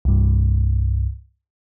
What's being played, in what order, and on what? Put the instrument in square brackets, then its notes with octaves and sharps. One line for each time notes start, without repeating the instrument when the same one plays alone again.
[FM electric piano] C2 G2